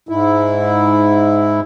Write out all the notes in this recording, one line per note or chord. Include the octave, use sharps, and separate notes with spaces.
G#2 E4